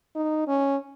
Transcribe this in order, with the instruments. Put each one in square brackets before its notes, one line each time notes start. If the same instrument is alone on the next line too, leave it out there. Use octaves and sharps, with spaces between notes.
[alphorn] D#4
C#4